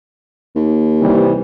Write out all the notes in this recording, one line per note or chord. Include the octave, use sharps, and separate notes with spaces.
D#2
C3 E3 G3